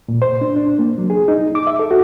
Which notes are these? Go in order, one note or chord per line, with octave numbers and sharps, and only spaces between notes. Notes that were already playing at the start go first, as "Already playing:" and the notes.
A#2
C5
D4
D4
A#3
F#3
G#4
D#4
D6
E5
A4
F#4